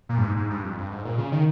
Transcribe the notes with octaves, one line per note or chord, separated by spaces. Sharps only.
A#2
G2
G#2
G#2
G2
F2
G2
G#2
A#2
C#3
D#3